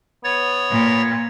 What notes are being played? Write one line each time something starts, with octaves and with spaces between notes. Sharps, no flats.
B3 C#5 A6
A#2